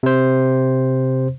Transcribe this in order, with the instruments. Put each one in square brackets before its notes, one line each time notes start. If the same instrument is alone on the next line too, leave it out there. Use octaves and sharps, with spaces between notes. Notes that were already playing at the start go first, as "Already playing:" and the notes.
[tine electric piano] C3 C5